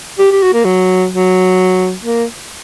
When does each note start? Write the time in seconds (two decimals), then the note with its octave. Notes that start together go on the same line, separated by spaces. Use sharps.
0.19 G4
0.31 G4
0.43 F#4
0.54 A#3
0.65 F#3
1.12 F#3
2.03 A#3